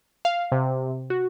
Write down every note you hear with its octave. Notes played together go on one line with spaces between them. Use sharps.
F5
C3
F#4